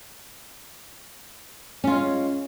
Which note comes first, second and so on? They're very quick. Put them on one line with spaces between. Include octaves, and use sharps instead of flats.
C#4 F4 G#3